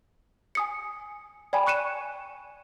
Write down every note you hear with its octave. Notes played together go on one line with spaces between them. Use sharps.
G#5 D#6 C#7
D5 G5 G#5 B5
C#6 F#6 C#7 D#7 E7